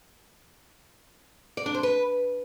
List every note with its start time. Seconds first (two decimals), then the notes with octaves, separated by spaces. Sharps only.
1.57 D5
1.66 D4
1.75 C5
1.83 B4